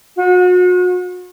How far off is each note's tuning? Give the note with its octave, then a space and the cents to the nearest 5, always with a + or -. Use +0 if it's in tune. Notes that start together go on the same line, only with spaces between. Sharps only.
F#4 -40